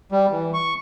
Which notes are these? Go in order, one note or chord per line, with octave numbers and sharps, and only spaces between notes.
G3
E3
C#6